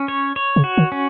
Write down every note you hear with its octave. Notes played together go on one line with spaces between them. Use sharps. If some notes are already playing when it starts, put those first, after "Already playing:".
Already playing: C#4
C#5
C#5
C#3
F#4
D#3
C#4